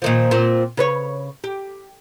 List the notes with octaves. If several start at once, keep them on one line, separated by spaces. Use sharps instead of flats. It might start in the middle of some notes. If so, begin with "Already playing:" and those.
A#2 D#3 F3
A#2 C4
C#3 B4 C#5
G4